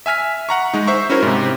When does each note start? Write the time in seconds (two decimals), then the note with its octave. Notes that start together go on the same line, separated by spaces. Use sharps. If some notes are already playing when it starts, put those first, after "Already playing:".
0.06 E5 G#5 F6 B6
0.49 F#5 A#5 C#6
0.74 G#3 D#4
0.87 C5 E5 C#6
1.10 C#4 E4 F#4 A#4 C5
1.22 G#2 C3